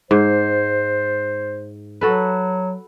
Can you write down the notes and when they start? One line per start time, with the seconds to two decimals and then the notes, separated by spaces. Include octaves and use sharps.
0.11 G#2 C5
2.01 F#3 F#4 A4 B4